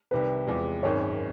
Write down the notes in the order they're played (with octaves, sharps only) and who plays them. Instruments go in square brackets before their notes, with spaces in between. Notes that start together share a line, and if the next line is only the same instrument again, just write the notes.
[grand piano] C2 C3 D#3 [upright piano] B4
[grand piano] E2 C3 F3 G#3
[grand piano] G#1 F#2 D#3 G#3 C4 [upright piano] C#5